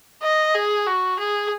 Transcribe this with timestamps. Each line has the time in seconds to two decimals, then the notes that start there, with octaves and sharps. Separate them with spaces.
0.22 D#5
0.55 G#4
0.87 F#4
1.19 G#4